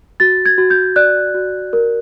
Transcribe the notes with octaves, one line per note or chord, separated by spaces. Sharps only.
F#4 A6
G#6
F#4
G6
D5 F#6
F#4
A#4